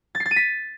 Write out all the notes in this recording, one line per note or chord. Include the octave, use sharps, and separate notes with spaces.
A6
C7
A6
D#7
B6